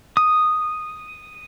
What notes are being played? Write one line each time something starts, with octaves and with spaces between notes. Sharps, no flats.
D#6